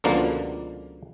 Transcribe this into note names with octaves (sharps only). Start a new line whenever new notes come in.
C#2 B2 D3 F3 A#3